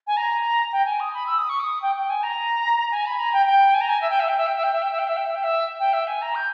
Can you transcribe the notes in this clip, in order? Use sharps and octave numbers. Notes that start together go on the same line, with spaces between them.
G#5
A#5
G5
G#5
D#6
B5
E6
D#6
C#6
D#6
G5
G5
G#5
A#5
G#5
B5
A#5
G5
G5
G#5
A#5
G#5
E5
G5
E5
G5
E5
G5
E5
G5
E5
G5
E5
G5
E5
G5
E5
G5
E5
G5
E5
G#5
A#5
G6